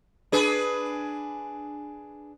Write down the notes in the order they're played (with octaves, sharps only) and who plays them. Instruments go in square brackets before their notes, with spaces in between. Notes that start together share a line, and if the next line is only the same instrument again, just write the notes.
[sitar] D4 G#4 B4